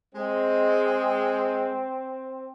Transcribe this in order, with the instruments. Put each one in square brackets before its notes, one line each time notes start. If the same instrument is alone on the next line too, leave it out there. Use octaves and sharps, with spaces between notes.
[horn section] G#3 [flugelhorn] C4